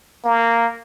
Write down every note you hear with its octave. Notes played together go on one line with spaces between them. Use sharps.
A#3